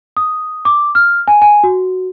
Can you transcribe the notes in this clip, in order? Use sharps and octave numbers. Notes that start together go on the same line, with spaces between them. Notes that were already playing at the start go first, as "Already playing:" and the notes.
D#6
D6
F6
G#5
G#5
F#4